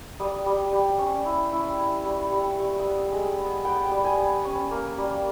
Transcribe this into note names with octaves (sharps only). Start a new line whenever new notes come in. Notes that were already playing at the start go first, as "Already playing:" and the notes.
G3 D#6
G3
G3
C#4
E4
E4
E4
G3 C#6
G3 C#6
G3 C#6
D#6
B3 E6
G#3
D#6
B3
B3 G5
G3
G#5
B3
C#4
A#3
G3